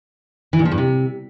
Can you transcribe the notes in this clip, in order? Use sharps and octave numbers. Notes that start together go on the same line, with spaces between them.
E3
A#2
F3
G2
C3